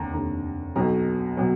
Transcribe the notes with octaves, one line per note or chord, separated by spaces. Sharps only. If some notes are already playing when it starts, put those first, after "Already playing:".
Already playing: F1 D#2 D3 A#5
F1 D#2 D3 A#5
B1 B2 F#3 A#5
B2 F#3